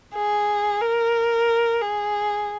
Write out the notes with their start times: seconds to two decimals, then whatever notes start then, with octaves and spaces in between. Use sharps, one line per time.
0.14 G#4
0.81 A#4
1.82 G#4